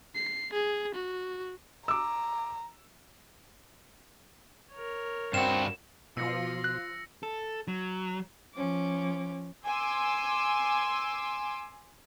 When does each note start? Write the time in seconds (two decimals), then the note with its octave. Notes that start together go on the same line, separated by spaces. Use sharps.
0.15 C7
0.53 G#4
0.95 F#4
1.88 A#5 D6 E6
4.72 A#4 C#5
5.34 G2 C4 F#4 E7
6.17 B2 F3 F4 E6 A#6 C#7
6.64 F#6
7.23 A4
7.68 F#3
8.56 F3 C#4 D6
9.67 G#5 C6 D6 E6